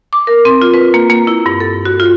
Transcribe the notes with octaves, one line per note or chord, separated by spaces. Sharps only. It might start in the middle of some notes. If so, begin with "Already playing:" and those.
D6
A#4
C4
F4
B4
A#3
A#3
E4
G2
A4
F#4
F4